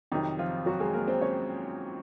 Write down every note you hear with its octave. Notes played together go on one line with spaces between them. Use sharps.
F2 C3 D#3 F#3 D#4
F3 F4
F#3 F#4
G#3 G#4
A#3 A#4
C4 C5
C#4 C#5